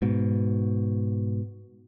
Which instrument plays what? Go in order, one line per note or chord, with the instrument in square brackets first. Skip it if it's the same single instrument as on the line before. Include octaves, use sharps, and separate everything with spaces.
[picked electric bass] G#2 B2